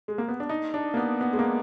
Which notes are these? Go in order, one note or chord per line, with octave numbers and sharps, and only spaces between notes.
G#3
A#3
B3
D4
D#4
D4
A#3
B3
B3
G#3
A#3